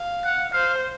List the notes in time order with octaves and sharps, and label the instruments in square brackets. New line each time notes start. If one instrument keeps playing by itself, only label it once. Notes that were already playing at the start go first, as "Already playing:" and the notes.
Already playing: [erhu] F5
[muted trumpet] F#5
[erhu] C5 [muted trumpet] F5